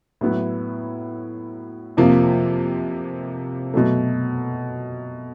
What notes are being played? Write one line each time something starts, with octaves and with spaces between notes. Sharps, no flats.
A2 F#3 B3 E4
F2 C3 F3 A#3
B2 F#3 A3